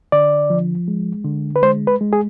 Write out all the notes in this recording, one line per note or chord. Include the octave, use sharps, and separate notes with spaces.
D3 D5
F3
G#3
D3
B4
G#3 C5
B4
G#3
G#4